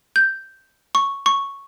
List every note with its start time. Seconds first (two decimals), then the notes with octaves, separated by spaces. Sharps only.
0.16 G6
0.95 C#6
1.26 C#6